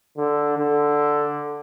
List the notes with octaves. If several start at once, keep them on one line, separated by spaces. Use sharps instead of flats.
D3
D3